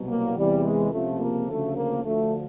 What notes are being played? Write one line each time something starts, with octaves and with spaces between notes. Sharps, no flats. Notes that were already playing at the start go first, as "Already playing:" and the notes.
Already playing: C2 B2 F#3
A#3
E2 C3 E3 G3
G#3
C#2 C3 F3 A3
A#3
D2 C#3 F3 A3
A#3
D2 D3 F3 A3